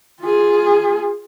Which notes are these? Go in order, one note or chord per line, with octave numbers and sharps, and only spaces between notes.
F4 G#4